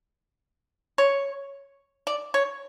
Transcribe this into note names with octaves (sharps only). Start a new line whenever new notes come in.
C#5
D5
C#5